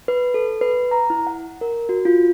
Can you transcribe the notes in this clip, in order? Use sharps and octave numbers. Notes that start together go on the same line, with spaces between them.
B4
A4
B4
A#5
E4
F#5
A#4
F#4
F4